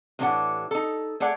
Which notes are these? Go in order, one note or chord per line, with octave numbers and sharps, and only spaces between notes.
A2 E3 C4 D4 G4 F#5
D#4 A4
A3 G#4 C#5 D5 F#5